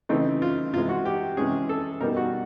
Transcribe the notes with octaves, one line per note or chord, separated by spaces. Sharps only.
C#3 E3 A3 C4 D#4
F4
C3 E3 G#3 F4
F#4
G4
C3 E3 G#3 C#4 G#4
A4
B2 G3 B3 D#4 A#4
F#4